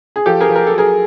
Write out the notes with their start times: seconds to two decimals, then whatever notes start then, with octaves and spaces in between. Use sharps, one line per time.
0.16 G#4
0.26 F3 G4 A4
0.41 G#4 A#4
0.49 F3
0.55 A#4
0.67 F#3 A4
0.78 G#4 A#4